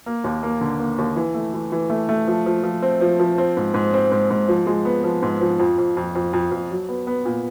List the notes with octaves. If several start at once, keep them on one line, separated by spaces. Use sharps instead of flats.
A#3
D#2
A#3
D3
A#3
D#2
E3
A3
E3
E3
A3
A3
F3
F3
F3
C4
F3
F3
C4
G#2
G#2
C4
G#2
G#2
F3
G#3
B3
F3
G#2
F3
F2
F2
F2
F2
F2
F2
F#3
B3
B3
A#2